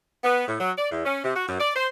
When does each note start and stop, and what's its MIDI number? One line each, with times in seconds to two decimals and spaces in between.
0.24 0.44 59
0.47 0.57 45
0.60 0.71 54
0.77 0.90 74
0.91 1.03 40
1.05 1.23 61
1.24 1.33 48
1.35 1.47 66
1.48 1.57 42
1.60 1.74 74
1.76 1.87 72